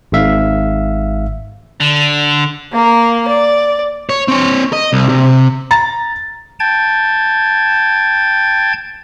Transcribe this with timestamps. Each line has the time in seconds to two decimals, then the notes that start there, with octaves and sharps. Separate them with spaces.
0.12 G#1 G#2 E5 F5
1.81 D3
2.72 A#3 A#4
3.27 D5
4.09 C#5
4.28 C4 C#5
4.73 D#5
4.93 C2
5.09 C3
5.71 A#5 A6
6.60 G5 A5 G#6